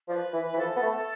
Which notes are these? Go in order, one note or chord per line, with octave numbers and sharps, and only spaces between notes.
F3 D5
B4
E3
E3
F3 A4
B3
A3